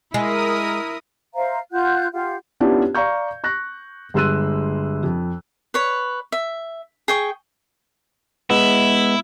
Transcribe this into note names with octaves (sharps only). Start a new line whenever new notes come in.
G#3 E4 A#4 D#6
C5 E5 F5 A#5
F4 F#5 F#6 G6
F4 G4 F5 F#5
B3 C#4 D4 E4 F4 G4
D5 F5 A#5 C#6 G6
C#6 F#6 A#6
G1 G#3 C6 E6 F#6 D#7
F2
B4 C#5
E5
G#4 G5 C#6
G#3 B3 E4